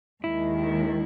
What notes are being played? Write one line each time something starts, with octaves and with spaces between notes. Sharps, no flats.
D#2 D#3 G#3 E4